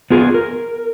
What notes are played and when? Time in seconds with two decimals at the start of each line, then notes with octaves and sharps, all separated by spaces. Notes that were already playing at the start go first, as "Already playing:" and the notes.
0.10 B3 F4 G#4
0.34 A#4